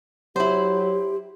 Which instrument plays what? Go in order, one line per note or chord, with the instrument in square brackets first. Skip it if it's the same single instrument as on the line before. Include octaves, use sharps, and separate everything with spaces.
[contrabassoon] F#3 [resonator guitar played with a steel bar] E4 C5 [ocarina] G4